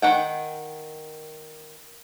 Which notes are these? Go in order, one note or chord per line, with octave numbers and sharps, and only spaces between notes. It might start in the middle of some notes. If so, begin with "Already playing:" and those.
D#3 F#5 G5